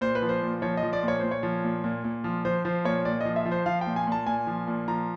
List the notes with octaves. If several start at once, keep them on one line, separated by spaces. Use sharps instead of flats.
A#2 C5
B4
F3
C5
A#2
F3 C#5
D#5
F3
D5
A#2
C#5
A#2 C5
C#5
F3
A#2
A#2
A#2
F3
F3 C5
F3 C5
A#2 C#5
A#2 D5
F3 D#5
E5
F3
C5
F3 F5
G5
A#2
G#5
A#2 A5
A#2 G#5
F3
A#2
F3 A#5